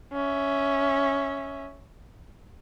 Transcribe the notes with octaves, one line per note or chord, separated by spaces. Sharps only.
C#4 E5